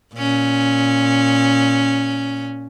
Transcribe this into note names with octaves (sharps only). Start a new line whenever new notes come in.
A#2 C#4